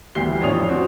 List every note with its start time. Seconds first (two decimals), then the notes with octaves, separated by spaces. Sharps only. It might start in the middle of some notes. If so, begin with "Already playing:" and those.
0.15 D2 E3 G3 G4 C7 G7
0.40 A1 F2 D4 C#5 D#6 F7
0.69 C4 C#4 F#4 C5